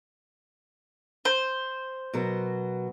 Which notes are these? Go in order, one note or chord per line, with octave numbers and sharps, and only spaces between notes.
C5
B2 F#3 A#4